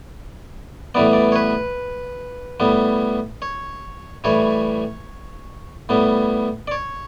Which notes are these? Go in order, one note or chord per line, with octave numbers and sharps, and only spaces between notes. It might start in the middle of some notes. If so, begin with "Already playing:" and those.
A2 E3 G3 B3 D5
D5
C#5
B4
A2 G3 B3
C#5
A2 E3 G3 C#5
A2 G3 B3
D5
C#5